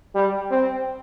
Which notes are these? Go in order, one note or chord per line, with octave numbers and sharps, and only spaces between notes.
G3
C4